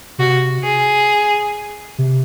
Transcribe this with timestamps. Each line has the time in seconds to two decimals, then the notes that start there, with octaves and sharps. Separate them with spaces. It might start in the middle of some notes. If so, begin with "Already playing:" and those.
0.18 C3 F#4
0.64 G#4
1.98 C3